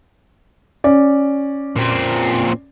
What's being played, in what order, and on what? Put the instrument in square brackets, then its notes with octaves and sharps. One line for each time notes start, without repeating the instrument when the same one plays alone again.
[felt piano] C#4 D5
[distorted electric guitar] A#2 C4